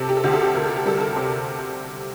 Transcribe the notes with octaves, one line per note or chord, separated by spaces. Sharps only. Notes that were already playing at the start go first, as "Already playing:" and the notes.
Already playing: C3 A4
G4
A4
D2 G4
A4
G4
D2 A#4
A4
G4
G3 A4
A#4
A4
C3